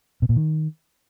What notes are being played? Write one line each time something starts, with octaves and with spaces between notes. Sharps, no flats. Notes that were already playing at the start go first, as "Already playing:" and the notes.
B2
A#2
D#3